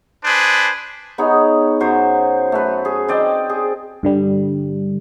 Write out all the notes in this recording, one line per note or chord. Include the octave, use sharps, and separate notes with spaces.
D4 G#4 B4 C5
B3 D#4 G#4 C#5
F#2 F#3 C5
A3 B4
G#4
C4 D5 D#5 G5
G#4
G2 D3 G3